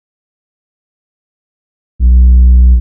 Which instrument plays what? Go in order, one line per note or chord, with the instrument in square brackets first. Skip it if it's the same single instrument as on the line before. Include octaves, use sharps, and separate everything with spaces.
[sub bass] B1